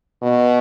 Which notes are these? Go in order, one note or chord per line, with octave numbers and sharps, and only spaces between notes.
B2